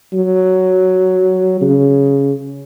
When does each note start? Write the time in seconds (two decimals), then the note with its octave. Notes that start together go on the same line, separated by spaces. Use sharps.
0.13 F#3
1.61 C#3